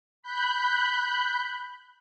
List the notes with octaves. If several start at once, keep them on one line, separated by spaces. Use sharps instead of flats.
B5 F#6 G6